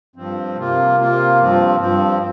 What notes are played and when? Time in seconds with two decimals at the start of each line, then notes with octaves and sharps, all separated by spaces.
0.16 G2 F3 C4
0.56 C3 A#3 F4
0.98 C3 A#3 F4
1.39 G2 F3 C4
1.80 G2 F3 C4